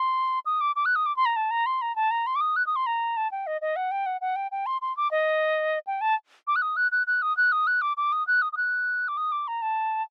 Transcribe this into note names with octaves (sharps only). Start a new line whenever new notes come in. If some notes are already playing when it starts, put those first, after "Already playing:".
Already playing: C6
D#6
D6
D6
F#6
D#6
D6
C6
A#5
A5
A#5
C6
A#5
A5
A#5
C6
D6
D#6
F#6
D#6
C6
A#5
A5
G5
D#5
D#5
F#5
G5
F#5
F#5
G5
G5
C6
C6
D6
D#5
G5
A5
D6
F#6
D#6
F#6
F#6
F#6
D#6
F#6
D#6
F#6
D6
D6
D#6
F#6
D#6
D#6
F#6
D6
D#6
D6
A#5
A5